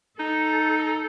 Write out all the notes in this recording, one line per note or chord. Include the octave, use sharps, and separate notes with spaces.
D#4 A4